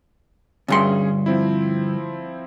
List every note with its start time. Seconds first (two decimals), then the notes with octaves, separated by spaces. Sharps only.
0.68 D2 G2 C#4 G#4 C6
1.26 F3 C4 E4